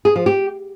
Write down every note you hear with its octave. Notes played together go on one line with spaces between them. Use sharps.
G#4
F3
G4